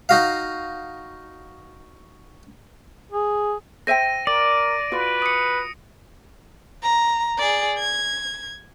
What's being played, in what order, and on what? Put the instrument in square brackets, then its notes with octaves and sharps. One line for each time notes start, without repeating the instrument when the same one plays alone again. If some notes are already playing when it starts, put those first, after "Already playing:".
[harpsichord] D#4 F#4 F5
[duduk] G#4
[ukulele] C5 E5 G5 [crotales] A#6 D#7
[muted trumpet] A#4 [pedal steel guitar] D5 [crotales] D7
[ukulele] F4 F#4 [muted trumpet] B4
[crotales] D#6 C#7
[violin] A#5
G#4 D5
G#6